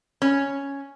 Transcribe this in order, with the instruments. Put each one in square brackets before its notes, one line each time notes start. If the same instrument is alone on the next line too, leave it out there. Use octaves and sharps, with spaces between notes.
[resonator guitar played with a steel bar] C#4